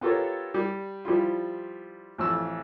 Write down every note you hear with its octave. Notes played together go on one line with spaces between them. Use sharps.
B3 F4 G4 A4 A#4 C#5
G3
F3 G3 E4 F4
A1 F2 E6